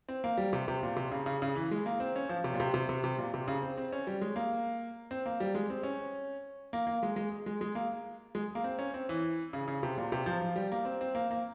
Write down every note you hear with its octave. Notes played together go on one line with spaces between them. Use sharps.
C4
A#3
G3
C3
C3
A#2
C3
C#3
C#3
C#3
E3
G#3
A#3
C4
C#4
F3
C3
A#2
C3
C3
C3
C3
A#2
C3
C#3
C4
C4
C#4
G3
G#3
A#3
C4
A#3
G3
G#3
C4
C#4
A#3
A#3
G#3
G#3
G#3
G#3
A#3
G#3
A#3
C4
C#4
C4
E3
C#3
C#3
C3
A#2
C3
F3
F3
G3
A#3
C4
C4
A#3
A#3